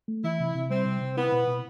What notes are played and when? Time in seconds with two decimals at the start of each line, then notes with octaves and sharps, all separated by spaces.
0.08 A3
0.23 E3 E4
0.40 C3
0.55 C3
0.70 G3 C4
0.86 C3
1.01 C3
1.17 B3 E4
1.32 B2
1.47 B2